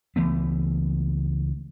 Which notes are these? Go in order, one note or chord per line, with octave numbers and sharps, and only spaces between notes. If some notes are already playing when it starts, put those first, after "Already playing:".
C#2 E3 A3 B3